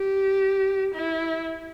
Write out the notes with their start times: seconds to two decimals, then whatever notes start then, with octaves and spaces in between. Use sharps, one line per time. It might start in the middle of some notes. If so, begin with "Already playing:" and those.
Already playing: G4
0.94 E4